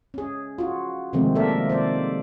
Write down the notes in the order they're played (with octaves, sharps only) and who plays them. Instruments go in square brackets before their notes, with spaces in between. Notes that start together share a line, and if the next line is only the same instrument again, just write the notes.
[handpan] C#4 G#4
F4 F#4
C3 D#3 F3 G#3 A3 C4
A#3 A4 A#4 D5 E5
C5 D5